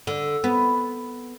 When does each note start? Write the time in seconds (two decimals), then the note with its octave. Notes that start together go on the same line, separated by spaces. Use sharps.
0.07 D3
0.44 B3